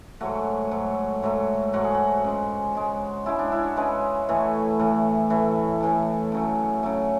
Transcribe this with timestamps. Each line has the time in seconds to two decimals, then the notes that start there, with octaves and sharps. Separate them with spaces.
0.21 G#2 F#3 A3 F#4
0.71 G#2 F#3 A3
1.22 G#2 F#3 A3
1.73 G#2 F#3 A3 F#4
1.84 G#4
1.94 F#4
2.24 C#3 G#3
2.75 C#3 G#3
3.26 C#3 G#3 E4
3.39 D4
3.52 E4
3.64 F#4
3.77 C#3 G#3 B4
4.29 A2 E3 A3
4.79 A2 E3 A3
5.30 A2 E3 A3
5.81 A2 E3 A3
6.32 C#3 F#3 A3
6.83 C#3 F#3 A3